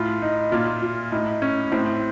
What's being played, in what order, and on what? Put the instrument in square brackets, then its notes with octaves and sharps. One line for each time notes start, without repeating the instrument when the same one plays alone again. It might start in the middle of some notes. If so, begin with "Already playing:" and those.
Already playing: [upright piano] A2 F4
D#4
A#2 F4
F4
A2 D#4
C#4
A2 C4